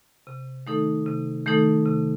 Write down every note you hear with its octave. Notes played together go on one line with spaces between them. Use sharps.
C3
D#3 A3 D#4 A4
C3
D#3 A3 D#4 A4
C3